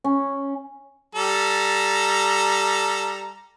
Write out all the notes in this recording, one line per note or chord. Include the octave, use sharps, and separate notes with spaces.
C#4
G3 A4 A#5